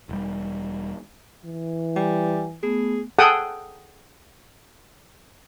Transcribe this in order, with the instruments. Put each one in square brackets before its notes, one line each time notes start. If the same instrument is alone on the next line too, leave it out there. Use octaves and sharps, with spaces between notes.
[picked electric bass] E1 G3
[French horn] E3
[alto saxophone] G3 [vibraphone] G#5
[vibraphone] A3 B3 [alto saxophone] G#4
[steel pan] G#4 A4 F#5 G5 A5 D#6